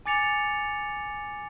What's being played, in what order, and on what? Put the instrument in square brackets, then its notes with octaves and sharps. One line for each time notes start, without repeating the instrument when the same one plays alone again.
[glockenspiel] G#5 D6 A6 C#7 F7